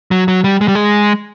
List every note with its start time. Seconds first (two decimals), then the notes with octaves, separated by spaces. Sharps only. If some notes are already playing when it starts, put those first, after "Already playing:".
0.11 F#3
0.28 F#3
0.44 G3
0.61 G#3
0.68 G3
0.75 G#3